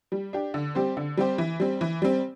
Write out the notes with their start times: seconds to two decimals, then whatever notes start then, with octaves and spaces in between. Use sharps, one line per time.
0.12 G3
0.33 D4 G4
0.54 D3
0.75 G3 C4 G4 C5
0.97 D3
1.17 G3 C4 G4 C5
1.38 E3
1.60 G3 C4
1.81 E3
2.02 G3 C4